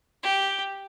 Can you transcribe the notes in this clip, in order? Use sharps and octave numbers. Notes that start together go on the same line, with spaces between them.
G4